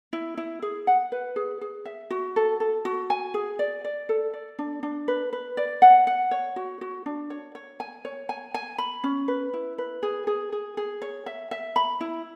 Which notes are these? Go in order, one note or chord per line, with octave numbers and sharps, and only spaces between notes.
E4
E4
G#4
F#5
B4
G#4
G#4
E5
F#4
A4
A4
F#4
G#5
G#4
D5
D5
A4
D5
D4
D4
B4
B4
D5
F#5
F#5
C#5
F#4
F#4
D4
C#5
C#5
G#5
C#5
G#5
G#5
B5
C#4
B4
E4
B4
G#4
G#4
G#4
G#4
C#5
E5
E5
B5
E4